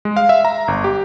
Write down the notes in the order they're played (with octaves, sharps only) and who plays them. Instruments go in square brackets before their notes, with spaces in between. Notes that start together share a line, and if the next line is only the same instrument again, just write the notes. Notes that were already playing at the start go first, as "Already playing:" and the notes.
[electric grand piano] G#3
F5
E5
A#5
G1
G4